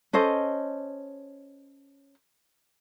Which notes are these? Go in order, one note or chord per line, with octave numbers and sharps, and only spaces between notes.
C#4 A4 C5 D#5